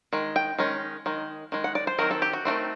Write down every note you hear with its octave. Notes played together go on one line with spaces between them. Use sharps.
D#3 G#3
G5
D#3 G#3 C#4
D#3 G#3
D#3 G#3
F#5
D5
C5
D#3 F#3 C4 A#4
A4
G4
F#4
D#3 F#3 A3 C4